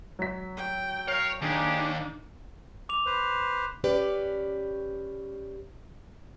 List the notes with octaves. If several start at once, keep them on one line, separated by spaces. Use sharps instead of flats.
F#3 B6
G5
A#4 C#5 F5
D#2 D4 D#4 G4 G#4
D6 F7
B4 C5
C#4 G4 B4 D5